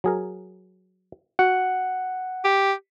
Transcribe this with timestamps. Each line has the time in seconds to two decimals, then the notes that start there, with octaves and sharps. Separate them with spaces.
0.04 F#3 G#4 A#4
1.39 F#4 F#5
2.45 G4